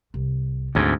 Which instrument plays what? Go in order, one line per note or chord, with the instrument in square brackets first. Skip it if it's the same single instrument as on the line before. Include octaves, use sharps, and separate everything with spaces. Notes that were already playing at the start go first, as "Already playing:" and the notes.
[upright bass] C2
[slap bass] D2 G#2 [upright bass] C4